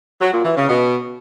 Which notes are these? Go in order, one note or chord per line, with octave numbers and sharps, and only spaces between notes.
F#3
A#2
E3
C#3
B2